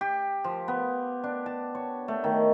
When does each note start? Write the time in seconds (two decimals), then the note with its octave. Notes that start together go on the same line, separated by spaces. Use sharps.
0.01 G4
0.44 F3
0.68 B3
1.24 D4
1.46 A5
1.75 C#5
2.08 A3
2.24 D#3